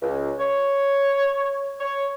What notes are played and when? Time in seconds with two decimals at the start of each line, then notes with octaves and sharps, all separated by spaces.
0.02 C#2
0.39 C#5
1.80 C#5